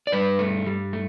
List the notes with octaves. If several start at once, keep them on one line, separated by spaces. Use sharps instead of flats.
D5
G2 G3 B4
A3
G3
A3